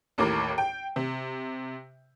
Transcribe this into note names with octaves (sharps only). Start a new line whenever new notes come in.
A1 D#2 A2 A#4 D6 C7
G5
C3